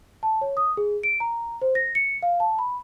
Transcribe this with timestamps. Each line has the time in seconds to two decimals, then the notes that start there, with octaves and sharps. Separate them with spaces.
0.23 A5
0.41 C#5
0.57 D#6
0.77 G#4
1.03 D7
1.20 A#5
1.62 C5
1.75 A#6
1.95 C#7
2.23 F5
2.40 A5
2.59 B5